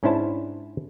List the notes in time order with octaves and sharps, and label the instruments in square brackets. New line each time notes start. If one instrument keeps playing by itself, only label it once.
[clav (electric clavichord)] G#2 C#4 D4 E4 C5 A5